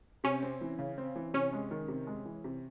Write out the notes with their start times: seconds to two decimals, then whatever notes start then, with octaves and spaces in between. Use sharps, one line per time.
0.24 C3 C#4
0.43 C4
0.61 E3
0.79 C#3
0.98 C4
1.16 E3
1.34 C3 C#4
1.53 G#3
1.71 D#3
1.88 C3
2.07 G#3
2.25 E3
2.44 C3